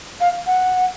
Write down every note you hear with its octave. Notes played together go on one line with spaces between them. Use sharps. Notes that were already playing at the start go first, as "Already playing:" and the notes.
F5
F#5